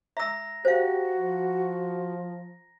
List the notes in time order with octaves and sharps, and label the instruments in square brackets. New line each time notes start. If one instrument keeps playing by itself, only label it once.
[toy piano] E5 E6 [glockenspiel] A#5 A#6
[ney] F#4 [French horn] G4 [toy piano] C5 F5
[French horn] F3